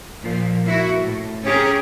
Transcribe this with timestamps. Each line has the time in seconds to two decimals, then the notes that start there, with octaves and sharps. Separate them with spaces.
0.23 A#2 F3
0.64 A#3 E4 F#4
0.98 A2
1.44 C#4 G4 G#4 A#4